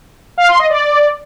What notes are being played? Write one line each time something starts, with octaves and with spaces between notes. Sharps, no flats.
F5
C6
D#5
D5